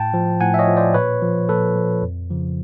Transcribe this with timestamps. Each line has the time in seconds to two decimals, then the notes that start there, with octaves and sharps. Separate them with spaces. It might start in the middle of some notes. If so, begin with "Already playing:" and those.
Already playing: A2 G5 A5
0.14 F3
0.41 A2 F#5 G#5
0.54 E5
0.59 C#5 D#5
0.68 F3
0.77 C5 D5
0.94 A#2 B4 C#5
1.22 F3
1.49 A#2 A4 B4
1.76 F3
2.02 F2
2.30 C#3 F3